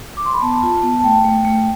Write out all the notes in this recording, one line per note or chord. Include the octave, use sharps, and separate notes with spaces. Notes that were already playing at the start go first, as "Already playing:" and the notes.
D6
C6
B5
B3 A5
F4
B3
A5
A3 G5
A3
A3